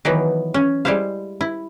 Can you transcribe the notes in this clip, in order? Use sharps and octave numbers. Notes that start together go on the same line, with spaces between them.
D#3 E3 F#3 B3
C#4
G3 G#3 E4 C5 F5
E4